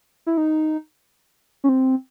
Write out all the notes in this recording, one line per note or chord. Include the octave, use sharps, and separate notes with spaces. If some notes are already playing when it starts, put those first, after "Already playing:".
E4
D#4
C#4
C4